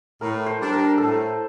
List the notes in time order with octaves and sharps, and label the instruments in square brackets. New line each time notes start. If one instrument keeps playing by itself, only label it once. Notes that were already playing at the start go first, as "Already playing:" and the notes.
[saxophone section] A2 [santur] A#4
[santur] C5
[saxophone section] G3 D4
[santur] A#4
[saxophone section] A2 [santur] A4